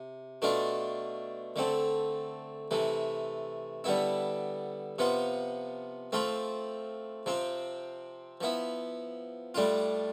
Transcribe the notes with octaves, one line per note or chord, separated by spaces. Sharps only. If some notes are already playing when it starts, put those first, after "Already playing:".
Already playing: C3
B2 A3 D4 F4
D3 A3 C4
C3 E3 A3
D3 G3 B3 E4
C3 F3 B3 F4
F3 A3 C4 F4
C3 F3 C4
F3 B3 E4
A2 G3 D4 F4